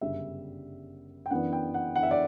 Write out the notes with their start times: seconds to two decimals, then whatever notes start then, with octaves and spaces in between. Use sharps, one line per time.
0.01 G1 F#2 C#3 G3 D4 E5
1.26 G5
1.31 F#2 E3 B3 D4 F#5
1.53 G5
1.74 F#5
1.96 F#5
2.03 E5
2.11 D5